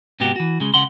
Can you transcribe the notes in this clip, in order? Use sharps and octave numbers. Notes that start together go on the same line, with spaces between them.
G#2 C3 B3 F#4 G4
E3 F#4
C#3 G#3
C#2 C#3 F#5 C6